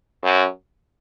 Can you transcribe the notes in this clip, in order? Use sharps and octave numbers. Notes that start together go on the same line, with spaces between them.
F#2